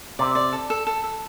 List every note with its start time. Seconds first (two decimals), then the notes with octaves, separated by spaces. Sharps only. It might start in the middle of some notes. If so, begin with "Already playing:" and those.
0.19 C3 D5
0.35 D5
0.53 A4
0.70 A4
0.87 A4
1.04 A4